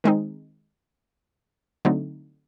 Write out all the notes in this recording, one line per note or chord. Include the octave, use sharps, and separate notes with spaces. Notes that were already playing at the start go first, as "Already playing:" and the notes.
D#3 G#3 C4 D#4
D3 F#3 A3 C4 D#4